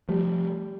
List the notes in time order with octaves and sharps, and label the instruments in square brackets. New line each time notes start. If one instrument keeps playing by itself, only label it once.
[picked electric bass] F3 A3 [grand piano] G3